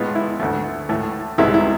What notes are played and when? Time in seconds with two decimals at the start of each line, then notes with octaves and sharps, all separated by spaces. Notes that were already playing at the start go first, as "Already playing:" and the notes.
Already playing: A2 G#3 B3 F4
0.15 E4
0.40 D2 D3 A3
0.89 A2 E3 A3
1.38 C2 C3 G#3 B3 E4
1.54 E4